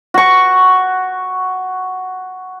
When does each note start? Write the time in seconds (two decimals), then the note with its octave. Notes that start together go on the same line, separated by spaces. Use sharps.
0.14 F#4 C#6